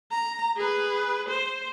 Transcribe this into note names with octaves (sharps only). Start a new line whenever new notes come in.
A#5
G#4 B4
C5